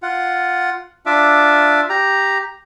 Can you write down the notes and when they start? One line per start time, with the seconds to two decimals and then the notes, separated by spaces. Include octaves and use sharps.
0.03 F4 F#5
1.06 D4 F4 E5 D6
1.89 G4 A#5